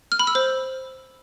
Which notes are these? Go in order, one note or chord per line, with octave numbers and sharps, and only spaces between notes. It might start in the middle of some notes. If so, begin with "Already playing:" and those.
F6
B5
E6
C5